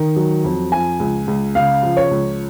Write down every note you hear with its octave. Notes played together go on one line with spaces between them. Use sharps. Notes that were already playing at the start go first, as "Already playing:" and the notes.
Already playing: D#3
F#3
F2
F3 G#5
C#2
C#2
C#3 F5
F3
C#5
C#2